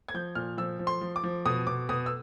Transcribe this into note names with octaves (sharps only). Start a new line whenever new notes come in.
G#6
F3 G6
A#2 F6
F3 E6
F3
C6
F3
D6
F3
B2 D#6
B2 D6
B2 D#6
E6